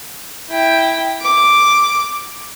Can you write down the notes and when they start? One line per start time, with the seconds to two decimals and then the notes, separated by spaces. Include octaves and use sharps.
0.49 E4 G5
1.22 D6